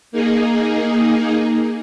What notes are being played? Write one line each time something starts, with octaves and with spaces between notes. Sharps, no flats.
A#3 D#4 G#4